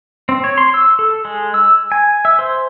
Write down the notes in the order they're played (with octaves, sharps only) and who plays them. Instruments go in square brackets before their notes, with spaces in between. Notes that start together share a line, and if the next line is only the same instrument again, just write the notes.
[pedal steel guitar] C4
C#5
C6
E6
A4
G#3
E6
G#5
E5
C5